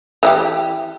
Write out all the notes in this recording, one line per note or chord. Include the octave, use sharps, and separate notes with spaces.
E3 D#4 G4